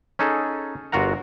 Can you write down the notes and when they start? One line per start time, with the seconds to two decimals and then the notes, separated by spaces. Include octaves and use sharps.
0.19 C#4 D#4 G#4 A4
0.92 G1 F4 F#4 A#4 F#5 A#5